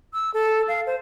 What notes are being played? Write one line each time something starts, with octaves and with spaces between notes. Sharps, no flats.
E6
A4
F5
C5